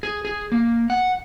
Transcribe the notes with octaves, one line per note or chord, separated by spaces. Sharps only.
G#4
G#4
A#3
F#5